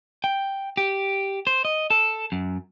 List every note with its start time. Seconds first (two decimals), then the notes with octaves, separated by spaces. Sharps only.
0.24 G5
0.77 G4
1.47 C5
1.65 D#5
1.90 A4
2.32 F#2